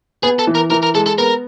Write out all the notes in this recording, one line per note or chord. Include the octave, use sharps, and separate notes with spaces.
B3 G#4
A4
E3
A#4
E3 A#4
A#4
G#3 A4
A4
B3 A#4